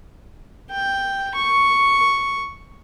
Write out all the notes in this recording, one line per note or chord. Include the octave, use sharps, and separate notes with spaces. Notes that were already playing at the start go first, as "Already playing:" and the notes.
G5
C#6